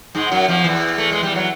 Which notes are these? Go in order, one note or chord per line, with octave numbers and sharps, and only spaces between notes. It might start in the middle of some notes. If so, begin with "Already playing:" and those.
G#2 G#3
F#2 F#3
F2 F3
E2 E3
A3
G#3
G3
F#3